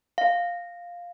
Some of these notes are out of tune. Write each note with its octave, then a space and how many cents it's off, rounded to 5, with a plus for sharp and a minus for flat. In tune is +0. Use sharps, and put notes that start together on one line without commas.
F5 +5